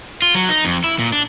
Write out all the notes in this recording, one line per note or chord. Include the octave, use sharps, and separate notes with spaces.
F4
F#3
D#4
F2
E4
A#2
D4